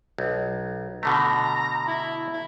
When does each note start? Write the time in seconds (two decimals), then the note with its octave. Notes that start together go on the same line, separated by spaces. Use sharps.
0.18 B1
1.03 B2 D3 A3 A#5
1.87 E4
2.33 E4